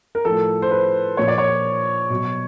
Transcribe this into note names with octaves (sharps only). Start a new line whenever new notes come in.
A#4
A2 F3 A4
C5
B4
A#2 F3 C#5
D5
C#5
B2 F#3